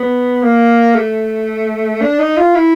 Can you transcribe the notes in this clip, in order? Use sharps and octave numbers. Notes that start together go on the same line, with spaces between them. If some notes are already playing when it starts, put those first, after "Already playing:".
Already playing: B3
A#3
A3
D4
D#4
F4
E4